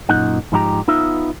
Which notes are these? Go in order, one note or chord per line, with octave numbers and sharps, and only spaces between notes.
F#2 A#2 F#3 A3 D#4 F#5
G#2 F3 D#4 E4 G4 A#5
B3 D#4 F4 E5